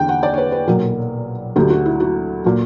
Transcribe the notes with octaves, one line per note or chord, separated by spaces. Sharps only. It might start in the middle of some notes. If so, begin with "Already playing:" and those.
Already playing: E2 D3 G5
F#5
D5
C#5
B4
B4
B1 A#2 F#3 A#4
D2 D3 F#3 G4
F#4
E4
F#4
A#2 F#3